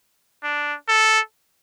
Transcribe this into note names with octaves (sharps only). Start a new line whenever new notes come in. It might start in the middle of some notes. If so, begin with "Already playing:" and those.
D4
A4